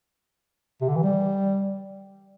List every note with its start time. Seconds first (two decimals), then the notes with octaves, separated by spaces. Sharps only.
0.81 C3
0.89 D3
0.95 E3
1.03 G3